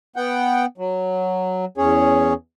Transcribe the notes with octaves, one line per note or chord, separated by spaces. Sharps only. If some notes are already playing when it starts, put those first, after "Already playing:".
B3 F#5 G5
F#3
E2 C#4 G#4 C#5